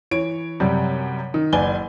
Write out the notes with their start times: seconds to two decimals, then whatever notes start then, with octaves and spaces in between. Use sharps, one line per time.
0.11 E3 C#5 D7
0.60 F#2 C3 G3
1.34 D#3
1.53 F#1 B4 D5 G#5 G7